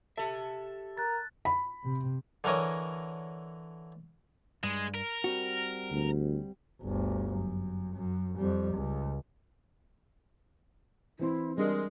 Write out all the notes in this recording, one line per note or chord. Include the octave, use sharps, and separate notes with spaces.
G4 A4 E5
A#4 F#6 A6
B5
C3
D3 E3 A#4 C#5 D#5
G2 G#3
A#4
G3 C4 F#4
D2
G1 D2
F#2
F#2
F2 G3
C#2
E3 C4 E4 C6
G3 G#3 D4 A#4